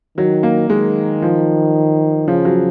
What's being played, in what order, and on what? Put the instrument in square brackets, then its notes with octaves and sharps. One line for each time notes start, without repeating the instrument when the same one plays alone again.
[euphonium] D#3 [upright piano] F#3
[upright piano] A#3
[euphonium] D#3 [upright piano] G#3
[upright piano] F3
[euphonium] C#3 [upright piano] F3
[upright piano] F#3